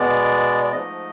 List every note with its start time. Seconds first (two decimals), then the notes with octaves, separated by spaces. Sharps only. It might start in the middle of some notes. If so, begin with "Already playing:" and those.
Already playing: B2 G#3 B3 D5
0.64 D5
0.72 G#2 F3 A3 D#5